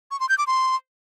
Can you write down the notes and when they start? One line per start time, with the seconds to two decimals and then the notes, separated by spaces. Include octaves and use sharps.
0.11 C#6
0.20 C6
0.29 G6
0.38 D6
0.47 C6